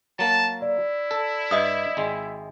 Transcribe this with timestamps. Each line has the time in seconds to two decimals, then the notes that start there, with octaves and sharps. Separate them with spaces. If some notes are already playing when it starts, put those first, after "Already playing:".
0.19 F#3 A#3 A5
0.62 E4 D5
1.11 A4
1.51 G2 D#5 E5 D#6
1.97 G#1 G#3